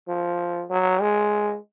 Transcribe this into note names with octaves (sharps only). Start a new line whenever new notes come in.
F3
F#3
G#3